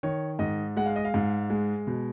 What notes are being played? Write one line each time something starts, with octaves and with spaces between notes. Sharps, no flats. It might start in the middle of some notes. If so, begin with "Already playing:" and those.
D#3 C#5
G#2 D#5
G#3 F#5
F5
D#5
F5
G#2
G#3
B2